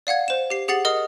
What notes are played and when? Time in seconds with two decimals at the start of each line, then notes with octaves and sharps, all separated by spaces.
0.07 D5 F5 F#5 G#6
0.28 C5 E7
0.50 G4 C7
0.68 G4 G#4 F#5 A6 C7 F#7
0.85 A#4 D#5 D#6